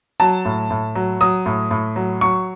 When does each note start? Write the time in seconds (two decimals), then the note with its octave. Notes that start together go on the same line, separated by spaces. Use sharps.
0.20 F#3 A5
0.45 A2
0.71 A2
0.95 F#3
1.21 F#3 D#6
1.46 A2
1.71 A2
1.96 F#3
2.21 F#3 C#6